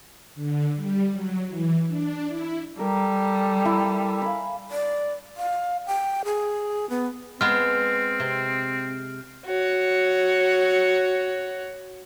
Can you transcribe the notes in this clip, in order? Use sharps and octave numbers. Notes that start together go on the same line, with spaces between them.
D3
G3
F#3
E3
D4
E4
G3 A4 A#4
E4 A#5
F5 G#5 B5
D5
F5
G5
G#4
B3
G#3 B3 C4 F6
C3
F#4 C#5